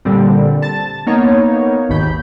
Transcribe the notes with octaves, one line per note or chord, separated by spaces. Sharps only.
A#2 D3 G3 C4
A5 A6
A#3 B3 D#4 C#5
G#1 D#2 B5 G6